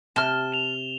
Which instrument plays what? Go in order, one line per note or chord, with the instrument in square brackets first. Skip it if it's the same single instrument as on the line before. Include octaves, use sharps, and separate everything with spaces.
[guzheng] C3 [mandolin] A5 F6 [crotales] E7 G7
[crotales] E7 F7